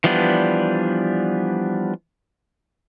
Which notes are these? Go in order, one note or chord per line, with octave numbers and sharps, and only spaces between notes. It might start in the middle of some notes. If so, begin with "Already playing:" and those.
E3 F3 G3 B3 D4